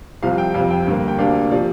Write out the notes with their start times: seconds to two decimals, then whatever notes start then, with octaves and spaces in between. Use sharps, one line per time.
0.23 C2 C3 F3 C4 F5
0.38 G5
0.54 F2 C3 G3 C4 F5
0.71 G5
0.87 G2 D3 A#3
1.08 G5
1.19 D2 C3 A#3 D4 F5
1.51 C3 F3 D5